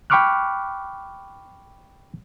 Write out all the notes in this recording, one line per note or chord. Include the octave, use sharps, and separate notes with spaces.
G5 B5 C#6 D6 F6 F#6